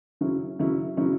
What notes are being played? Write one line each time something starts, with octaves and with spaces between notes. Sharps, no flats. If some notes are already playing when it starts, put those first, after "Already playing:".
C#3 F#3 C#4 E4
C#3 F#3 C#4 E4
C#3 F#3 C#4 E4